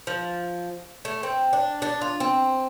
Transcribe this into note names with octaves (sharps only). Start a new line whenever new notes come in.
F3
A3
C4
D4
D4
F4
C4